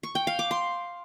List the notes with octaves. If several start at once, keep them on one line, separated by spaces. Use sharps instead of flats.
C#6
G5
F5
D6
C6